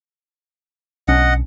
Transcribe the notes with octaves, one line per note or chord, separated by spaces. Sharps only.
B1 C#4 D4 D#5 F#5